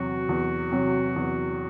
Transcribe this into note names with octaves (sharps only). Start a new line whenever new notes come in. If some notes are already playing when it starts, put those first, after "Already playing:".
Already playing: E2 C3 F#3 F#4
E2
C3 F#3
E2